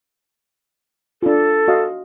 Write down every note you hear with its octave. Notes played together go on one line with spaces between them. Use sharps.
D4 F4 A4
F#4 D#5 F5